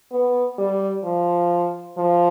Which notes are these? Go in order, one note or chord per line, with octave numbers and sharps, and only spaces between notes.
B3
G3
F3
F3